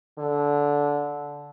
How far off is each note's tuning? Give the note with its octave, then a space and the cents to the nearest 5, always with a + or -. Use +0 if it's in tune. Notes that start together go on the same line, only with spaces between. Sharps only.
D3 -15